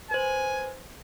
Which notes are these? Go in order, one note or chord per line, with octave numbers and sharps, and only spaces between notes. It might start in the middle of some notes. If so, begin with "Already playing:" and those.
B4 C5 G#5